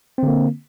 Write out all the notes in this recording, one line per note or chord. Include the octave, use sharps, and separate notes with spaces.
D3 A#3 C4